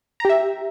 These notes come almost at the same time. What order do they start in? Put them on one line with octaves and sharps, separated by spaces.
A#5 G4 E5